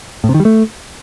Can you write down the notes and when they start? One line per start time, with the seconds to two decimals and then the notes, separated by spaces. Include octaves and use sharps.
0.24 A2
0.29 C3
0.34 D#3
0.40 G3
0.45 A3